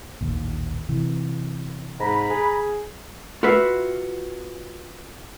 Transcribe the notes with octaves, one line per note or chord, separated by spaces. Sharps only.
A1 D#2 A#2
C3 E3
G#2 A#5 B5
G#4
F4 F#4 B4 E5